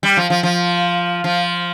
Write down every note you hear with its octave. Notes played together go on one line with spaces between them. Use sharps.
G3
F3
F3
F3
F3